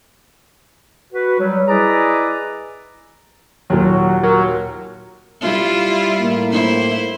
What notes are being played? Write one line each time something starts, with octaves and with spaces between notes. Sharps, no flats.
F#4 B4
F#3 G3
E4 G#4 B4 D5 D#5 A#5
D#2 A#2 F#3
F#3 A#4
G3 E4 F4
A2 A#3
E4 C5